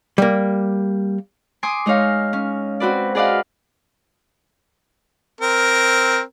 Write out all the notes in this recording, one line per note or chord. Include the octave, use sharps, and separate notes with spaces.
G3 A#3
G#5 C6 D6 D#6
G#3 D#4 C#5 F5
C#4
C4 F#4 B4 D5
G#4 B4 D5 D#5 F5 F#5
C4 A#4